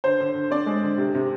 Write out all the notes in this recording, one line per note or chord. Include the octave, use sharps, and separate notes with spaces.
D3 C5
D3
D3
C4 D5
G#3
D3
C3
C3